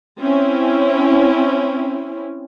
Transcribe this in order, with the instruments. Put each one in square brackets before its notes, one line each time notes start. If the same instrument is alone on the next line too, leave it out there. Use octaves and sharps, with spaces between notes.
[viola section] C4 C#4 E4